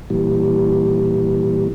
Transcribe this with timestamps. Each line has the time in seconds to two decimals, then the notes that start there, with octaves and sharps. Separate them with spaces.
0.10 A#2 E3 G3